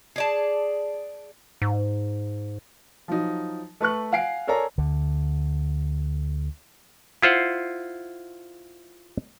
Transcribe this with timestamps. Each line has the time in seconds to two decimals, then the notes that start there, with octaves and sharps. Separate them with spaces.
0.16 G#4 D5 A5
1.62 G#2
3.08 F3 F#3 D#4
3.81 A3 B4 C#6 F#6
4.12 F5 F#5 G#5 C7 D7
4.47 A4 A#4 C#5 D5 G#5 A#5
4.78 D2 D3
7.22 E4 F4 C5 F#5